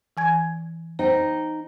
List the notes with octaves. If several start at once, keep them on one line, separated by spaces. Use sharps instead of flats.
E3 G#5 G#6
D#4 C5 G5